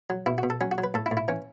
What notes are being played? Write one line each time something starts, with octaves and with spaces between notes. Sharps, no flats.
F#3
B2 E4
F#4
B2
A4
F#3 C#4
F#4
F#3
B4
A2 A4
E4
A2
E4
E3 C#4